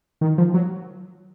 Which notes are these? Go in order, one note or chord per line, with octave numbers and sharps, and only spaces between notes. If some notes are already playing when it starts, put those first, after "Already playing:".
D#3
F3
F#3